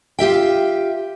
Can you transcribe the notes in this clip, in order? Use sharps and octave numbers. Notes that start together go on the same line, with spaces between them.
F4 G4 E5 G5